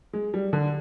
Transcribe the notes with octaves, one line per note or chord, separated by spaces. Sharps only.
G#3
G3
D3